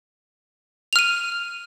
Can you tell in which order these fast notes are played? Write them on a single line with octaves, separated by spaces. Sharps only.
F7 F6 D#7